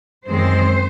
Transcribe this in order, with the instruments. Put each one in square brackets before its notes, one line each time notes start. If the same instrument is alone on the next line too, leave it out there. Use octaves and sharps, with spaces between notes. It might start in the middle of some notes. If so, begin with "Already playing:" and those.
[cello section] F#2 D#3 G#3 C4 C5